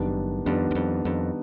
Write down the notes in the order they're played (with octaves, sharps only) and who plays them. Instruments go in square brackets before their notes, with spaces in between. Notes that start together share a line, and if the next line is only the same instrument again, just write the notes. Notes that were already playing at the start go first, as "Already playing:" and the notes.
Already playing: [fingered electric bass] F#1 F#2 [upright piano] D#3 G3 B3 D4
[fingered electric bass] F2 [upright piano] D#3 G3 B3 D4
[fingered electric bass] F#2
F2
[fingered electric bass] F2 [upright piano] D#3 G3 B3 D4